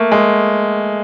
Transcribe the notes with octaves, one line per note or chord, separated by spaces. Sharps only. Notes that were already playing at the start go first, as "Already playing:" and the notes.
Already playing: A3 A#3
G#3